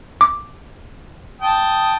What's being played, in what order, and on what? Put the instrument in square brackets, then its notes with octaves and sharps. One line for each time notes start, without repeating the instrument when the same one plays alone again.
[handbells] D6
[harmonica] G5 A5 D#6